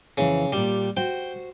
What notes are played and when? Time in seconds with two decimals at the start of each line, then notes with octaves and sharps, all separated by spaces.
0.18 F2 C#3 E3
0.52 A#2 G3 G4
0.97 F#4 C5 G5